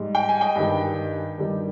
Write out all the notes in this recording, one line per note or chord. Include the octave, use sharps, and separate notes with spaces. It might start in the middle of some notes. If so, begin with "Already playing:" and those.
Already playing: G#2 G3
G5
G#5
D#5 G5
G2 D#3 G3
G2 D#3 G3